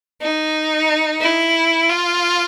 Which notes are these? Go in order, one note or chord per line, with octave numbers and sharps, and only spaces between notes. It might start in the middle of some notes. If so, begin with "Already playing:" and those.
D#4
E4
F4